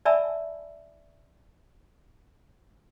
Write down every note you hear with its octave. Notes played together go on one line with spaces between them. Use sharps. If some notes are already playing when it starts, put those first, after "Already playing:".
D5 E5 G#5 A5 B5 E6